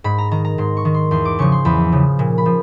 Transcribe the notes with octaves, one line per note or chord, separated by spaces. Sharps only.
G#2 B5
A#5
D#3 A#5
A#5
G#2 C6
C#6
D#3
C6
E2 C6
D6
C#3 F3 C#6
C6
E2 B5
C#3 F3
A#2
B5
F3